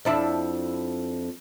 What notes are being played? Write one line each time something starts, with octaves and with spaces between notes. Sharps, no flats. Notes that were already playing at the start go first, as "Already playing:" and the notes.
F2 D4 E4